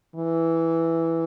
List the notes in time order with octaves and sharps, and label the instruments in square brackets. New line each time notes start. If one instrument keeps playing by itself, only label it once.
[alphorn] E3